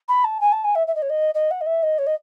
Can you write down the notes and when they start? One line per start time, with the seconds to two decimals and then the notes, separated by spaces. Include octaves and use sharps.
0.09 B5
0.24 A5
0.41 G#5
0.52 A5
0.64 G#5
0.75 E5
0.87 E5
0.95 D#5
1.02 C#5
1.10 D#5
1.35 D#5
1.51 F#5
1.61 D#5
1.66 E5
1.83 D#5
1.99 C#5
2.07 D#5